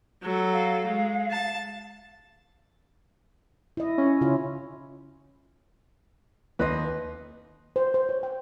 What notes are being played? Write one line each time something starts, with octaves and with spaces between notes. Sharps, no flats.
F#3 A4
F5
G#3
A5
E4 D#5
C#4
C#3 E4 F4
D#2 B4 D#5 C6
C5
C5
C#5
G5